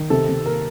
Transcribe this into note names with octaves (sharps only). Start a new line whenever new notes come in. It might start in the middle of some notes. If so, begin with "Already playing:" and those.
Already playing: D#3
C3 A4
C3
A#3 A#4